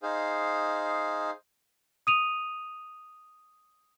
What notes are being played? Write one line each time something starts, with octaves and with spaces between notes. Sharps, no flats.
D#4 G#4 C5 F5
D#6 D#7 F7